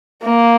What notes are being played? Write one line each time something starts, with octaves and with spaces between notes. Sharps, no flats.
A#3